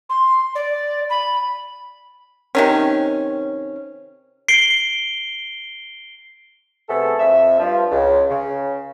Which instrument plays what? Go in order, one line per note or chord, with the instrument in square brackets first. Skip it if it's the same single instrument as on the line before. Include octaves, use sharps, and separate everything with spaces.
[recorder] C6
D5
B5
[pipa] C3 D#3 C#4
[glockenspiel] C7 D7 G7
[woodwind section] C3 A3 B3 G#4 A4
F2 E5
G2 F3 F4
C#2
C#3